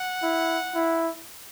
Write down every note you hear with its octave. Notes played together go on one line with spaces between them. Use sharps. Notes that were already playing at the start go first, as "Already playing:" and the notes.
Already playing: F#5
E4
E4